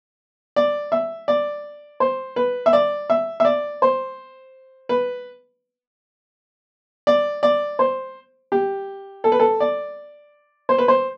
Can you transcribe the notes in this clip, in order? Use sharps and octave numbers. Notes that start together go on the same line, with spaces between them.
D5
E5
D5
C5
B4
E5
D5
E5
E5
D5
C5
B4
D5
D5
C5
G4
A4
B4
A4
D5
C5
B4
C5